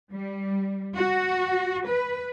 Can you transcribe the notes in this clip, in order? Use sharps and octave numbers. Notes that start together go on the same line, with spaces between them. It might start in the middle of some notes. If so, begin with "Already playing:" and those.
G3
F#4
B4